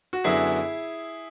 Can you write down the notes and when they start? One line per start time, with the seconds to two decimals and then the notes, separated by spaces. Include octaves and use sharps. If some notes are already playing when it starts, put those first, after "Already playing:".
0.13 F#4
0.24 F#2 D3 F#3 B3 E4 G#4